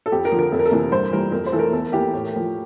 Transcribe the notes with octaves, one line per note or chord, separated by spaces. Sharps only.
A4
F2 G4
A#4
D3 F3
A#4
F2 A4
A#4
A4
C3 E3 A#3
G2 C5
E3 G3 A#3 A#4
F2 A#4
C5
E3 A3 A4 A#4
E2 A4
E3 A#3 G4
A2
F3 A#3